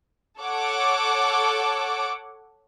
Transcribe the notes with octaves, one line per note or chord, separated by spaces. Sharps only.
A4 C#5 F#5 D6